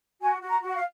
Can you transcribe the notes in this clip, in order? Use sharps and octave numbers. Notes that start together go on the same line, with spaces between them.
F#4 G#5
F#4
A#5
F#4
F#5
F5